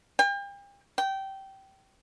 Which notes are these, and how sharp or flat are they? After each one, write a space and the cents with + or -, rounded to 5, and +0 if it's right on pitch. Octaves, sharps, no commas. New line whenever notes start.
G5 +40
G5 -20